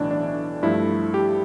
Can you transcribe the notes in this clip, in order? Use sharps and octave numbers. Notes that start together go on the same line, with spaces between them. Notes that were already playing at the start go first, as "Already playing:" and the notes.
Already playing: B1 A2 E3 D4
D4
G2 F3 A3 E4
G4